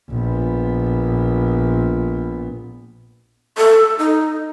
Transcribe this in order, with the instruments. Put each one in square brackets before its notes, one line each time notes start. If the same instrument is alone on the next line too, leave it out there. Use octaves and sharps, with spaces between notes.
[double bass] A#1 B3
[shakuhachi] A4
D#4